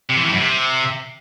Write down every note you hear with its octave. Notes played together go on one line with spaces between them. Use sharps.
C3
E3
A2
F#2
C3